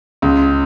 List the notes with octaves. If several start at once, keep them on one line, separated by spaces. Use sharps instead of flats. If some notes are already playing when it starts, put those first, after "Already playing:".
C#2